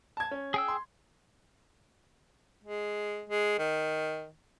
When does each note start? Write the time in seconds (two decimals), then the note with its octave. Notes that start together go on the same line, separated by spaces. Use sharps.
0.17 A5 G#6
0.31 C#4
0.54 G#4 G5 E6
0.68 C6
2.64 G#3
3.29 G#3
3.58 D#3